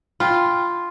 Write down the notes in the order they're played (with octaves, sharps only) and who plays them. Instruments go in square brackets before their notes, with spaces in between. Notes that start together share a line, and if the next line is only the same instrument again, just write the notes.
[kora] F4 [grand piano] G5 B5